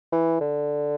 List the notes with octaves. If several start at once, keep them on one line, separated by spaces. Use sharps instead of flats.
E3
D3